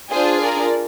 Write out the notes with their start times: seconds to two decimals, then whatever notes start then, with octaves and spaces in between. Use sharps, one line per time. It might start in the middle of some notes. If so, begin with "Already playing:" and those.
0.10 D4 F4 G#4 C5
0.41 A#4 D5